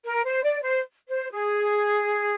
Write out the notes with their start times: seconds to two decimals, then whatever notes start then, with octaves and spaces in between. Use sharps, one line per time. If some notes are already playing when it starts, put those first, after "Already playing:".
0.04 A#4
0.24 C5
0.43 D5
0.62 C5
1.07 C5
1.32 G#4